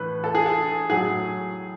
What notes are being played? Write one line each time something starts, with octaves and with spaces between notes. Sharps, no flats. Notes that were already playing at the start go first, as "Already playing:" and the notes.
Already playing: A2 E3 B4
A4
G#4
A4
A2 F#3 G#4